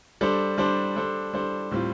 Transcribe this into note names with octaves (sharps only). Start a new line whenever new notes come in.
G3 D4 A4 C5
G3 D4 A4 C5
G3 D4 A4 C5
G3 D4 A4 C5
A2 G3 C4 F4